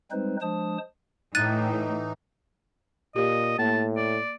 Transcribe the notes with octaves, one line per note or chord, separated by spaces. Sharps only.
G3 G#3 C4 D#4 B4 C5
F3 G#3 D4 C5 A5 D#6
A2 E3 D#4 F#6 A6 D#7
A#2 G4 D#5
A2 A#3 A5
D5